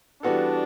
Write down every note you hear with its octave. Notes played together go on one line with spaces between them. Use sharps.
E3 G3 B3 D4 F#4 A4